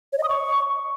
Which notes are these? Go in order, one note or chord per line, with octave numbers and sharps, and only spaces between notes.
C#5
D#5
D#6
C#6